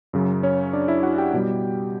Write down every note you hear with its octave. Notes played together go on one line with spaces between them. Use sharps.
F#2 C#3 F#3
C#4 C#5
D4 D5
E4 E5
F#4 F#5
G4 G5
B2 G3